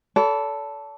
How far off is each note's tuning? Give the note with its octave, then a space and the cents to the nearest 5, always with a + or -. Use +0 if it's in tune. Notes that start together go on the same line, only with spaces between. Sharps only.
A4 +0 D5 -45 B5 +0